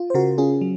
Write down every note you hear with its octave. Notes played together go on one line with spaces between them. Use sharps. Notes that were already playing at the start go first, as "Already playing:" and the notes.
Already playing: F4
C5
C#3 F#4 A#4
C#4 F4 G#4
F#3